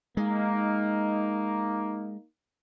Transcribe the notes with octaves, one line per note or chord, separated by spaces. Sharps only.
G#3 A#3 D#4